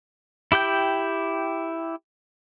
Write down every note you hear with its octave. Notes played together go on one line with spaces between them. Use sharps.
E4 G4 G5 G6